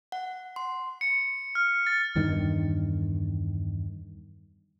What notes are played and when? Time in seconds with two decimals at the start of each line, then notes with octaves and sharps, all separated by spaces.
0.12 F#5
0.56 C6
1.01 C#7
1.55 F6
1.87 A6
2.16 E2 G2 D#3